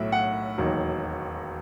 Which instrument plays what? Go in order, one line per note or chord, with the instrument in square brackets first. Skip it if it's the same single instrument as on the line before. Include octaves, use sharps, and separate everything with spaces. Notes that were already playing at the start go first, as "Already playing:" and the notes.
Already playing: [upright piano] B1 A2 F#3 E5
F#5
E1 D#2 D#3 F#3